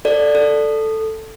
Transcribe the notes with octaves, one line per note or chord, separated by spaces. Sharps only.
A4 D5
A4